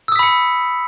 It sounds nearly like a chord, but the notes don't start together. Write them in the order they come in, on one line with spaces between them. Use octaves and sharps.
E6 D#6 B6 B5 C#7